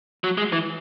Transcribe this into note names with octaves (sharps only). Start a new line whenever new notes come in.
F#3
G#3
E3